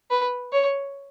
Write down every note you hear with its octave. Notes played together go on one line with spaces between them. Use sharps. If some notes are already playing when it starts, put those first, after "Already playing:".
B4
C#5